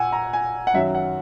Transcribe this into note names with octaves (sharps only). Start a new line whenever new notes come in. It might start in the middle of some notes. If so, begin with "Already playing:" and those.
Already playing: A#2 F#5 G#5 E6
A#5
G#5
F#5
F#2 D#3 F#3 E5
F#5